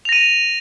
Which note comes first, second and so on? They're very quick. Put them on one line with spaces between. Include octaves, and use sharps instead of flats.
F7 A#6 D#7